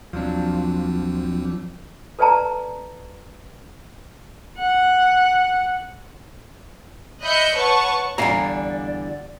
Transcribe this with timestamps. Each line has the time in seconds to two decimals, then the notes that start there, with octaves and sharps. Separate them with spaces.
0.13 D#2 F3 F#3 C4 D4
2.19 A4 B4 D5 G5 A5 A#5
4.58 F#5
7.22 D#5 E5 B5 F#6 G6 C#7
7.54 B4 C#5 F#5 A5 C#6
8.18 E2 D3 G3 D5 F5 G#5 A#5